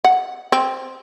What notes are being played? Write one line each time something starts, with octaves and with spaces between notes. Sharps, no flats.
F#5
C4